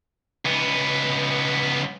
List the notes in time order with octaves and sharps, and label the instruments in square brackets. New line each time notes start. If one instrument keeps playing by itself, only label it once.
[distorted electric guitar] C#2 B3